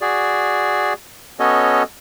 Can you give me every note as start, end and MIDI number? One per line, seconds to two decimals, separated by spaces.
0.01 0.93 66
0.01 0.93 68
0.01 0.93 74
1.39 1.83 59
1.39 1.83 61
1.39 1.83 66
1.39 1.83 69
1.39 1.83 73
1.39 1.83 75